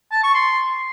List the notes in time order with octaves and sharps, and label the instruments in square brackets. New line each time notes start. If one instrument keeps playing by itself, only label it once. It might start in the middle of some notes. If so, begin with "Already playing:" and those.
[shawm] A5
C#6
C6